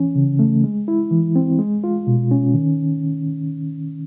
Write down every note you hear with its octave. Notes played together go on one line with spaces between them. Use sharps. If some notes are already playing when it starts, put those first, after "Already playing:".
Already playing: E3 C#4
C#3
A3
G#3
E4
E3
C4
G#3
F4
B2
C#4
D#3